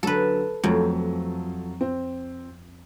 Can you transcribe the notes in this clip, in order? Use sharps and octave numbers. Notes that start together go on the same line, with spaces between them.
D3 F#3 A4 B4
F2 F3 F#3 A3
C4